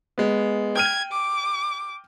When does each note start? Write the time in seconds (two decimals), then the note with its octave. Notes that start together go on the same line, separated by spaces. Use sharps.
0.18 G#3 B3
0.76 G5 F6 G#6 D#7
1.12 D6